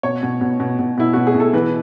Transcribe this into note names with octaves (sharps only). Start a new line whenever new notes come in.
B2 C#5
B2
B2
B2
B2
B2 E4
B2 F#4
G#4
B2
A4
E3 B4